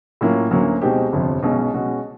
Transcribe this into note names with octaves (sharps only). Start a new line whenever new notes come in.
A2 F#3 A#3 C#4 F4
D2 D3 F#3 A#3 C#4
B2 G#3 C4 D#4 G4
G1 F2 C3 F3
B1 B2 G#3 C#4
B2 G#3 C#4 F#4